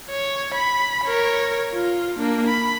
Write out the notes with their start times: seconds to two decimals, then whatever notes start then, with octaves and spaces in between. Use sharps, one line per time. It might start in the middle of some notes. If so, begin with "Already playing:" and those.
0.10 C#5
0.55 B5
1.05 A#4 C#5
1.73 F4
2.18 A#3 D4
2.47 B5